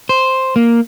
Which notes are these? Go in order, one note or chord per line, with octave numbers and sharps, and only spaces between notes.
C5
A#3